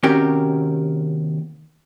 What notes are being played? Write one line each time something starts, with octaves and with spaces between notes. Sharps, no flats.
D#2 C3 C#4 F#4 G4 A#4